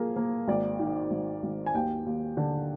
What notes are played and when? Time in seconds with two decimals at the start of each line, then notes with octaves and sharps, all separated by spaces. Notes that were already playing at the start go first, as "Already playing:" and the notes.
Already playing: F3 A#3 G#4 A#4
0.16 A#3
0.48 G#1 D5
0.79 D#3
1.11 G#1
1.43 G#1
1.66 G#5
1.74 D#2 G5
2.06 D#2
2.37 D3